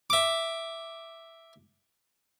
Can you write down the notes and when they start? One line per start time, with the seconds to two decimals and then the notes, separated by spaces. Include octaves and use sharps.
0.10 E5 D6